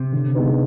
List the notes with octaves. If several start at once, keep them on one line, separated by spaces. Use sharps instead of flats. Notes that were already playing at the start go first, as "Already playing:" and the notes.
Already playing: C3
D3
G#3 B3 D#4 B4